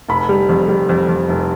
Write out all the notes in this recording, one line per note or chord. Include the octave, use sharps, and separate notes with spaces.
F1 B5
G3
F2
G3
F2
F2
F1